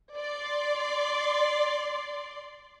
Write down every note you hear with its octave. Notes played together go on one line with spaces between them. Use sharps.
D5 C6